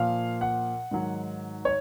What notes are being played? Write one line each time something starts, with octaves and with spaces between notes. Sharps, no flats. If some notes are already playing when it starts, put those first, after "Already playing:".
Already playing: A#2 F3 F5
F#5
G#2 D#3 F#3
C#5